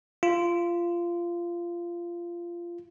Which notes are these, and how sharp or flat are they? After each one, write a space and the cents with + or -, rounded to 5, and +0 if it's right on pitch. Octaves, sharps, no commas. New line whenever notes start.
F4 -20